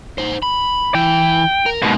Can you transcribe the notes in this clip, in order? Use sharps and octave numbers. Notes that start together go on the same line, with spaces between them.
D#4 C5
B5
E3 G5
A#4
G#2 B2 G#3 A#3